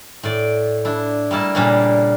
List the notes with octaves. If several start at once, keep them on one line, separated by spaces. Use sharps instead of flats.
A2 D5
D4 E4
G3 A#3 E4 A5
A#2 C#3 G3 A#3 D4